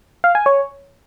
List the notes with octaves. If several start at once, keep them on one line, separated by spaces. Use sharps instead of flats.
F5
G#5
C#5